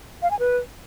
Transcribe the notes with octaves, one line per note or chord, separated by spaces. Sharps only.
F5
G#5
B4